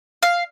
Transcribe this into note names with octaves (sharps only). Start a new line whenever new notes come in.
F5